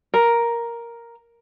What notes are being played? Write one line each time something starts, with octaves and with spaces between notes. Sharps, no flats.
A#4